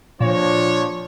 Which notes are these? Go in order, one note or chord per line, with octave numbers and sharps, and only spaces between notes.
A#2 F3 D4 C#5